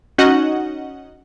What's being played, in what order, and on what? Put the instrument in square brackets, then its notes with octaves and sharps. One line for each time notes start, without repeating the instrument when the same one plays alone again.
[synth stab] C#4 D#4 F#4 D#5 F#5